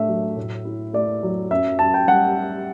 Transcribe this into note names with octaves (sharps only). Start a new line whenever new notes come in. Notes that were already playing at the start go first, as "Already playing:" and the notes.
Already playing: A2 A3 D4 E5
F#3
A2
E4
A3 D5
F#3
F#2 E5
F#2 A5
G5
G3 F#5